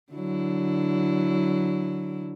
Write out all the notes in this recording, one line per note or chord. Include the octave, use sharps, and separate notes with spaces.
D3 F#3 E4